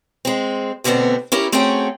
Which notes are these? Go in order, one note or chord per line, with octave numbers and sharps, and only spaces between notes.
G#3 C4
D2 B2 D3 G#3 B3 C4
C#4 E4 G4 A#4
A3 C4 C#4 F#4 G#4 G5